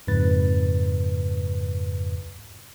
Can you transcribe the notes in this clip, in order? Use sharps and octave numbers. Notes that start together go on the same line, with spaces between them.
F2 G#2 C#3 B4 A6